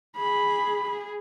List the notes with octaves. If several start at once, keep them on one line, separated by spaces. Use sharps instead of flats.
G#4 B5
G#4